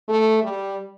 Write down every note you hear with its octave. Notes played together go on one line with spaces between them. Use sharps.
A3
G3